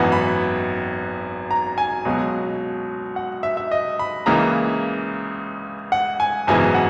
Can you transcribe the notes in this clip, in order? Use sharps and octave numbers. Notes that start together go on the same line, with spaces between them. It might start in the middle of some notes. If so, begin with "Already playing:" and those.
Already playing: G#1 F#2 E3 B3 F#5
B5
A#5
G#5
C#2 B2 F#3
F#5
E5
E5
D#5
B5
C#2 C#3 E3 A#3 A#5
F#5
G#5
G#1 F#2 C#3 E3 B3 G#5
F#5